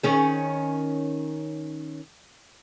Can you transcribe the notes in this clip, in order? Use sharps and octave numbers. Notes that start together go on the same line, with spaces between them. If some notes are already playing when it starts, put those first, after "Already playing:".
D#3 C#4 G#4